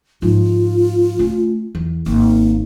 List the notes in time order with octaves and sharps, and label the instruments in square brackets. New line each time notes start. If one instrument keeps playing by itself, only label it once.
[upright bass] G#2 F3 [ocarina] F4
[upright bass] A3 C#4
E2
[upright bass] G#1 [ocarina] A#3